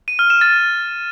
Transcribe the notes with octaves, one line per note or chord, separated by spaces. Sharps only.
D#7
F6
E7
A6